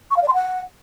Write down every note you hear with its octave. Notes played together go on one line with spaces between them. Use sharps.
C#6
F5
D5
C6
F#5